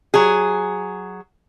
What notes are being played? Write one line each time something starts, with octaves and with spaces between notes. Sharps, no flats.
F#3 G#4